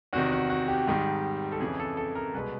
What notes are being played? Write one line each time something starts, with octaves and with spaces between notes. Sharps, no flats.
E2 C3 D#3 F#4
F#4
F#4
G4
G#2 D#3 G3
A4
F2 C#3 E3 G#4
A4
A4
A#4
C2 B2 G#3 B4